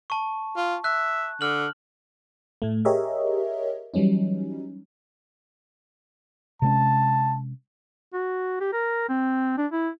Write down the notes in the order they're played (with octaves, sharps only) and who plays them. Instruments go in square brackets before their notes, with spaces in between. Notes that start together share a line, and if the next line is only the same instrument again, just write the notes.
[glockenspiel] A5 C#6
[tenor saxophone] F4
[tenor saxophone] E5 [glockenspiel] F#6
[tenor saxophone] D3 [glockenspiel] F6 F#7
[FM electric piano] A2 A3
G4 G#4 A#4 C#5 D#5 E5
E3 F#3 G3 C#4 D#4
[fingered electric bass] C3 G#3 C#4 [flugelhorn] A5
[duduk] F#4
G4
A#4
C4
D4
E4